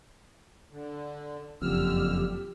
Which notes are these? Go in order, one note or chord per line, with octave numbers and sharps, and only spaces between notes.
D3
F#1 F2 D3 G4 E6 F6